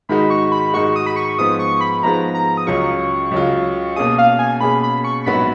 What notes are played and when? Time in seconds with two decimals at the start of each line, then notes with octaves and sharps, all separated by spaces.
0.09 G#2 D#3 G#3 D#4 F#4 B5
0.30 C#6
0.52 B5
0.74 G#2 D#3 G#3 D#4 F#4 C#6
0.96 D#6
1.06 B5
1.16 C#6
1.38 G#2 F3 G#3 B3 D#6
1.59 C#6
1.81 B5
2.03 G#2 F3 G#3 B3 A#5
2.35 A#5
2.57 D#6
2.67 C#2 C#3 F#3 C#4 F4 C#6
3.31 C#2 C#3 F#3 C#4 F4
3.96 B2 A#3 C#4 G#4 D#6
4.18 F5
4.39 G#5
4.61 B2 A#3 C#4 G#4 B5
4.83 B5
5.04 C#6
5.26 A#1 G#2 F#3 B3 F#4 B5